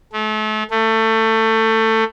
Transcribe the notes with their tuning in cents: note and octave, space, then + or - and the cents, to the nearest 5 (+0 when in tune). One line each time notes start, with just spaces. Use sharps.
A3 -35
A3 +20